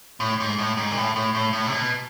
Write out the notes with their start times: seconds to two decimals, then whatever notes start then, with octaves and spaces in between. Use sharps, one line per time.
0.20 A2
0.40 G#2
0.58 A2
0.77 G#2
0.91 A#2
0.97 A2
1.16 A2
1.35 A2
1.53 A2
1.67 C3
1.73 B2